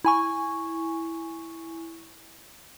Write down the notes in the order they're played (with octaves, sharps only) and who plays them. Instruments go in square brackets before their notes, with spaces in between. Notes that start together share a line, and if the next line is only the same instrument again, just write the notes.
[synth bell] E4 G#5 C#6